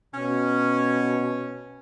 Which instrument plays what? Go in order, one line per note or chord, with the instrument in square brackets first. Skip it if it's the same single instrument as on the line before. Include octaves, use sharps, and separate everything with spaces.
[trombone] B2 [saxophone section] C#4